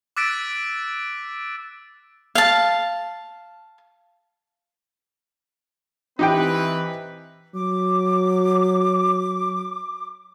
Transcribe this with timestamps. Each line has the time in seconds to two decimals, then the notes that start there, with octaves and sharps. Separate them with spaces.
0.17 D6 E6 F#6 A6 B6 D7
2.35 F5 A5
6.19 E3 C4 D#4 G4 B4 G5
7.54 F#3 D6